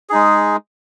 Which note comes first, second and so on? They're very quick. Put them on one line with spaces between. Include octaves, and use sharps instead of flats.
G#4 D#4 G#3